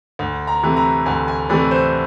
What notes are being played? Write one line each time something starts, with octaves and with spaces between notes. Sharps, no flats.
D2
A#5
C3 E3 A3
A#5
D2 G#5
G#5
C3 E3 A3 D5
C5